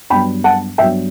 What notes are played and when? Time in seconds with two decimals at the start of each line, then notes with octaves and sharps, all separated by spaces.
0.10 G2 F#3 B3 D4 G5 B5
0.44 F#5 A5
0.78 G2 F#3 B3 D4 E5 G5